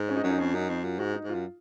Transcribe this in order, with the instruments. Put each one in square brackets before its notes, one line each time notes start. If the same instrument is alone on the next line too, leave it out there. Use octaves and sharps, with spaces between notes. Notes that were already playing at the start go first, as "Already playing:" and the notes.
Already playing: [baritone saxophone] G#2
[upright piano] C#4
D#4
[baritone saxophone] F#2 [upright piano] C#4
[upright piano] D#4
[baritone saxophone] F2 [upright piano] C#4
[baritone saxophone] F#2 [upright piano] D#4
[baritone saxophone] F2
[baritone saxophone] F#2 [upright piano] F4
[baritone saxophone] G#2 [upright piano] F#4
[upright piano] D#4
[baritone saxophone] G#2 [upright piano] F4
[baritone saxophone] F#2